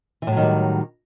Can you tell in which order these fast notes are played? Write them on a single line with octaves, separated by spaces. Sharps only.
E3 A2 F#3 D#3 G3